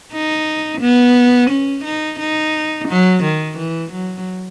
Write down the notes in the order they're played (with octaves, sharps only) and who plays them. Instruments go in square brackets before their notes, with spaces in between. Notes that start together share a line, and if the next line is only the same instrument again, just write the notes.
[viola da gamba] D#4
B3
C#4
D#4
D#4
F#3
D#3
E3
F#3